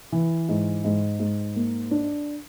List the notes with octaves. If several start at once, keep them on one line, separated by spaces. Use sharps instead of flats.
E3
G#2
G#2
G#2
A#3
D4